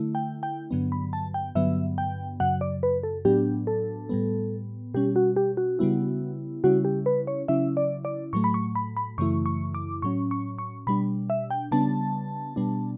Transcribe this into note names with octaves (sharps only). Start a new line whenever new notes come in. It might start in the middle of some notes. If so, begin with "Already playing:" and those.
Already playing: D3 A3 E4
G5
G5
G2 D3 F#3 B3
B5
A5
G5
G2 D3 F#3 B3 E5
G5
F#2 C#3 F#3 F#5
D5
B4
A4
A2 F#3 B3 D4 G4
A4
A2 G3 B3
B2 G3 C#4 G4
F#4
G4
F#4
C#3 G3 B3 E4
C#3 G3 C#4 E4 F#4
G4
B4
C#5
C#3 F#3 C#4 E4 E5
D5
D5
A2 F#3 A3 C#6
B5
C#6
B5
B5
F#2 C#3 E3 A3 E4 C#6
C#6
D6
A2 F#3 C#4 C#6
C#6
C#6
B2 G3 D4 B5
E5
G5
C#3 G3 B3 D4 A5
B2 G3 B3 D4